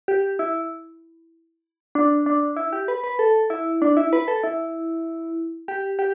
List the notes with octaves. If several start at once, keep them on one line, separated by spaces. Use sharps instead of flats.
G4
E4
D4
D4
E4
G4
B4
B4
A4
E4
D4
E4
B4
A4
E4
G4
G4